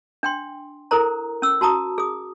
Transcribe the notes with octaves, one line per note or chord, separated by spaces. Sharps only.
D4 G5 C6
E4 A4 A#4 C5 A#5
C#4 E6
F#4 A5 A#5 D#6
G#4 D#6